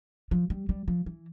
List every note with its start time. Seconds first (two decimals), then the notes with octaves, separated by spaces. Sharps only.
0.31 F3
0.50 G3
0.69 G3
0.88 F3
1.06 E3